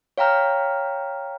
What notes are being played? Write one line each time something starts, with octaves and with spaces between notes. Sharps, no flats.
C#5 F5 G5 A#5 F6